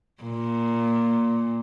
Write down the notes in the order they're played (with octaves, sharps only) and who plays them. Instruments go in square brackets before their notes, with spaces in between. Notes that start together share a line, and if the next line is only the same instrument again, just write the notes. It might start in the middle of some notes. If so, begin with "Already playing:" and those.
[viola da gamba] A#2